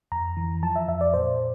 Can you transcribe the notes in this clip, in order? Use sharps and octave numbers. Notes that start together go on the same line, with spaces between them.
F2 A#5
E3
F3 A5
E5
F2 E5
D5
A#2 C5